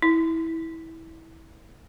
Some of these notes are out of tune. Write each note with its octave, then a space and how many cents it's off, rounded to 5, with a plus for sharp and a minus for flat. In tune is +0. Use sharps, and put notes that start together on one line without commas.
E4 -20